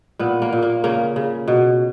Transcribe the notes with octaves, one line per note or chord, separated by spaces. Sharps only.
A#2 B3
A#3
A#2
A#3
C#3 A#3
C#3
B2